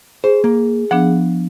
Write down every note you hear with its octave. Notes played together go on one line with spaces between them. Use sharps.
G#4 C5
A#3
F3 B3 D4 F#5